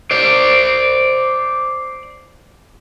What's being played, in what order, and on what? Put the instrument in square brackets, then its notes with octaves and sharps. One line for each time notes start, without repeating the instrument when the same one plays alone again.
[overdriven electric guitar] C5 D5